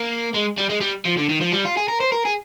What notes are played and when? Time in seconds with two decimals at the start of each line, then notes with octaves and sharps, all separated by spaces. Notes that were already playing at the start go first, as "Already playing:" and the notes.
Already playing: A#3
0.34 G#3
0.58 G3
0.70 G#3
0.81 G3
1.06 F3
1.18 D3
1.30 D#3
1.41 F3
1.53 G3
1.65 F4
1.77 G#4
1.88 A#4
2.00 C5
2.12 A#4
2.25 G#4